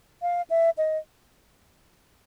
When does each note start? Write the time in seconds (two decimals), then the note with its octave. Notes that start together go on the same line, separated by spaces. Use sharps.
0.22 F5
0.50 E5
0.78 D#5